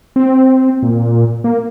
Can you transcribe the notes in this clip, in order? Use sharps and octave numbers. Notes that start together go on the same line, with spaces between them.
C4
A#2
A#3